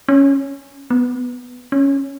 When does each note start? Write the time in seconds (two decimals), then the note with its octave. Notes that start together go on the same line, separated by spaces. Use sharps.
0.08 C#4
0.90 B3
1.72 C#4